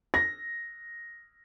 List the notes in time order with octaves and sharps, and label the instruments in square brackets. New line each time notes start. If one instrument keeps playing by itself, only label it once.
[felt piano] A#6